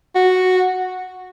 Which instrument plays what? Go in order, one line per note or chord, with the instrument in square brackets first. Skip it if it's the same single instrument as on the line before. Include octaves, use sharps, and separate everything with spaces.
[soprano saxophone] F#4